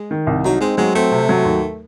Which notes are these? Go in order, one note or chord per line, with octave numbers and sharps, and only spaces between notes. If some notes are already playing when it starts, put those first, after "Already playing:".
Already playing: G#3
D#3
C2
F#3 D#4
G#3 C4
F#3 G#3
A3 C4
C3
F#3
D#2